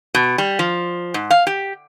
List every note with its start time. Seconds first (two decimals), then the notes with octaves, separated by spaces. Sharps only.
0.14 B2
0.38 G3
0.59 F3
1.14 G#2
1.30 F5
1.47 G4